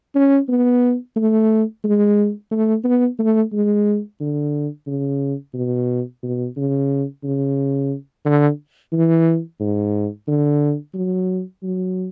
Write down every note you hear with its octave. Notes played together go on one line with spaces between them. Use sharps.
C#4
B3
A3
G#3
A3
B3
A3
G#3
D3
C#3
B2
B2
C#3
C#3
D3
E3
G#2
D3
F#3
F#3